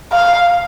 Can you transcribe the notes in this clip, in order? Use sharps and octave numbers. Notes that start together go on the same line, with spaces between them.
F5